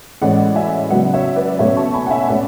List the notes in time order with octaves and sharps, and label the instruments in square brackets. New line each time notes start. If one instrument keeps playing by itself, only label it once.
[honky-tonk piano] A2 E3 G#3 C#4 D5 F#5
E5 G#5
C#3 F#3 B3 D5 F#5
C#5 E5
B4 D5
B2 A3 C#4 C#5 E5
A5 C#6
G#5 B5
F#5
E5 G#5
B2 A3 C#4 D5 F#5